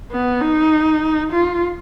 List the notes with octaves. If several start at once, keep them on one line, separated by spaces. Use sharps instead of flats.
B3
D#4
F4